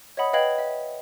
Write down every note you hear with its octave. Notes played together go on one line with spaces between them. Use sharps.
C#5 D#5 E5 F#5 B5 D#6
B4 D#5 F5 G5 G#6 F#7
E5